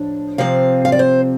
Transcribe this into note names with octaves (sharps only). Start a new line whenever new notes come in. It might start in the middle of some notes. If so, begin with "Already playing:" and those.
Already playing: A2 F3 D4
C3 F3 C4 F5
F5
D5
C5